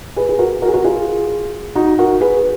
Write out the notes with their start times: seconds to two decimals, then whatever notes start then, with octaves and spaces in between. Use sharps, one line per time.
0.16 G#4 B4
0.29 G#4
0.39 F#4 A#4
0.62 F#4 A#4
0.68 G#4
0.74 F#4 A#4
0.85 F4 G#4
1.75 D#4 F#4
1.99 F#4 A#4
2.21 G#4 B4